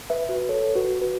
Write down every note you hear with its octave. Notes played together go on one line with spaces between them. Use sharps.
B4 E5
F#4 B4
A4 C#5
F#4 B4
F#4 B4